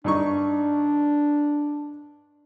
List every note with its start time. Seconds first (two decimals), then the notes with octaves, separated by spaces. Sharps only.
0.04 G2 D4 D#4 C#6